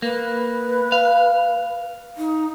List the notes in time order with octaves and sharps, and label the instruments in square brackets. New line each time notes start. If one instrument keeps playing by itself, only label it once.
[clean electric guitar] A#3 [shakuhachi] B4
[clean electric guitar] F5
[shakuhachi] D#4